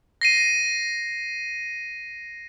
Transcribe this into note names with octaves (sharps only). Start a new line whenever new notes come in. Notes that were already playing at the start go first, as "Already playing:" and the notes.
A#6 C7 D#7